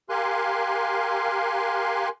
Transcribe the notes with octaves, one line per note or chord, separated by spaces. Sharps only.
G4 A#4 F5 G#5 C6 F#6